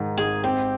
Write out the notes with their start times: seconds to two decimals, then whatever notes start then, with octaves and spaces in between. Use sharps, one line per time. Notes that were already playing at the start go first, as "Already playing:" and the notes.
Already playing: G#2 D#3
0.18 G#1 G#4
0.44 C4 G4